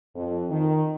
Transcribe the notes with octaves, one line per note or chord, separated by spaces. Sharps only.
F2
D#3